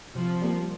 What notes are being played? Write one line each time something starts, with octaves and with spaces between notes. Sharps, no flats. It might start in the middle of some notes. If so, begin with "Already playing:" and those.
C3 F3
G3 A#3